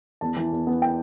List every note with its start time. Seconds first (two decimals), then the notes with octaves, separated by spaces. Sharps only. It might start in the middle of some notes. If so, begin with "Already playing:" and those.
0.21 E2 A5
0.36 E3
0.52 E2
0.67 B3
0.82 G5